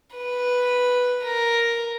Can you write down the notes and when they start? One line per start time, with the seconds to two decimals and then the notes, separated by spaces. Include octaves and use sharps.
0.16 B4
1.24 A#4